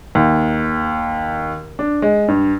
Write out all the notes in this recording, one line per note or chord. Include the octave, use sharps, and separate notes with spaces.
D#2
D4
G#3
G2